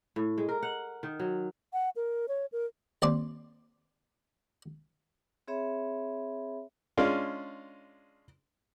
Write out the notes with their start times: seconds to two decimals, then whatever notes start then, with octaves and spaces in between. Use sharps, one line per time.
0.16 A2
0.38 G#3
0.49 A#4
0.63 F#5
1.03 D#3
1.20 F#3
1.73 F#5
1.96 A#4
2.28 C#5
2.52 A#4
3.02 D#2 C4 D5 A5 C6
5.48 C4 G#4 C#5 E5 B5
6.97 G#3 C#4 D4 F4